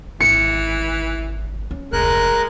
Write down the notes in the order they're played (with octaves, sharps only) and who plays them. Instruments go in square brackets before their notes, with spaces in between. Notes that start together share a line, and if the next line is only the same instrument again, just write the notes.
[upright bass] G#1 [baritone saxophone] E3 [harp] C#7
[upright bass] C#4
[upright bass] F1 D2 [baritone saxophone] G#3 [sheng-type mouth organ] A#4 F#6